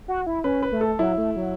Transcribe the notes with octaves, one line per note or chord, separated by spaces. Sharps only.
F#4
E4
C#4 B4
B4
A3
A4
F#3 E4
A3
F#3